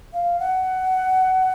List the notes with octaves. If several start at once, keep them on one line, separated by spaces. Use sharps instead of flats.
F5
F#5